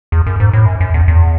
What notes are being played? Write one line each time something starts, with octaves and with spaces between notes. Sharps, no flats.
E2
F#2
G#2
A2
F#2
F#2
E2
E2